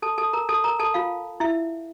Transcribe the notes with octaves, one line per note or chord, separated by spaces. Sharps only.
A4 A5
A4 A5
A#4 A#5
A4 A5
A#4 A#5
A4 A5
F4 F5
E4 E5